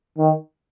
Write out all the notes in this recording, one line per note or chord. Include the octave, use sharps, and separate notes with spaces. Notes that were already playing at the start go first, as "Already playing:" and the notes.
D#3